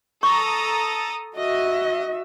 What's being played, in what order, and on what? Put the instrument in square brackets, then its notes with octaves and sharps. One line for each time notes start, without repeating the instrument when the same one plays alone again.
[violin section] A4 A#5 D#6 [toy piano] C#6
[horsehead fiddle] F#4 E5 [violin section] D#5